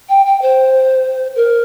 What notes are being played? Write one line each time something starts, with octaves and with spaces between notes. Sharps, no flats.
G5
G5
C5
A#4